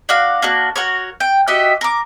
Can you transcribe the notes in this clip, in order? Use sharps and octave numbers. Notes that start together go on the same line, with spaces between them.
D4 F#4 F5
A#3 D4 F#4
F#4 A#4 C#5
G5
F#4 G4 D#5 E5
A#4 D6